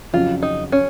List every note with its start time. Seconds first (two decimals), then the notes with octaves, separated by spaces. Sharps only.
0.13 F2 C#3 F#3 F4
0.43 D#4
0.72 C#4